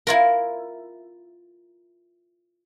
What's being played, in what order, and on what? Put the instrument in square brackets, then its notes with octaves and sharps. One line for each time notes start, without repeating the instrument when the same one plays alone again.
[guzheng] E4 F4 A#4